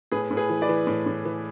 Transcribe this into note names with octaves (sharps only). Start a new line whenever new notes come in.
A2 G#4 B4
A2
G#4 B4
E3
B4 D5
E3
A2
A2
E3